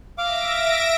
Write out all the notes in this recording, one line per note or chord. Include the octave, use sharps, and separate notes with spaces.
E5 F5 D6 A#6 D7